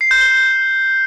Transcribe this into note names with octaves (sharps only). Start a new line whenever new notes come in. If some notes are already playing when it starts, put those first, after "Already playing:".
C7
G6
G7
G6